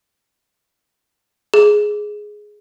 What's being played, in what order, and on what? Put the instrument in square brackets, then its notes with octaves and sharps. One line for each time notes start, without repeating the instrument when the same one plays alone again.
[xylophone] G#4